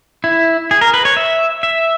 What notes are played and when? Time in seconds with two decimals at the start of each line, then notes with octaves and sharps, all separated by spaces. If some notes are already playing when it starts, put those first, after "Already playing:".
0.24 E4
0.71 G#4
0.81 A#4
0.94 B4
1.05 C#5
1.17 E5
1.63 E5